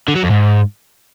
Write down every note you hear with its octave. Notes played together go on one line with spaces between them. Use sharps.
D3
F#3
F2
G#2